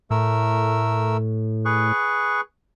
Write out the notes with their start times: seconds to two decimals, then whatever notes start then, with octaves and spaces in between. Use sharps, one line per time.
0.11 A2 A3 A#4 E6
1.65 G#4 B4 C#6